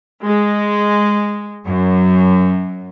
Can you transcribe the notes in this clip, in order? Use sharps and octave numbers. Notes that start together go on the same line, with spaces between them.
G#3
F#2